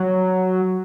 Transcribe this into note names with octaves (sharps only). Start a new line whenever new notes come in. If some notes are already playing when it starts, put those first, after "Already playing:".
Already playing: F#3